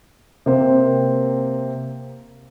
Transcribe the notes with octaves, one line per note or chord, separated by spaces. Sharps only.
C3 A#3 C4